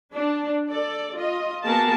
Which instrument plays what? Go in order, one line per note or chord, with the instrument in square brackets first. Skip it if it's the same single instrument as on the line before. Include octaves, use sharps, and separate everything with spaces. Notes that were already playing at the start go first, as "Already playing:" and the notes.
[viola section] D4
A4 D5
F4 D#5
A#3 B3 F#4 G#4 A#4 A5